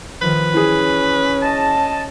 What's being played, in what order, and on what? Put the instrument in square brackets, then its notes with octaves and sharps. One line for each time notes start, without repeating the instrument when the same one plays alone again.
[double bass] D#3 F3 [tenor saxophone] B4
[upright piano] E3 G#4 [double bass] C#4
[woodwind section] D#5 A5